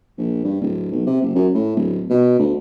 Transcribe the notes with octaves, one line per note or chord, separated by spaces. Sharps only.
A#1
G2
D1
B1
C3
F#1
F#2
A2
D1
B2
D2